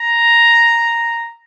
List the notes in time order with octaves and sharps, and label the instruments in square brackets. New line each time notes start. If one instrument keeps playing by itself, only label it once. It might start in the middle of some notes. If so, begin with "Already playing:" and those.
Already playing: [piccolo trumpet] A#5